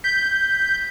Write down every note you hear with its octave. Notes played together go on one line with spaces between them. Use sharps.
G6 B6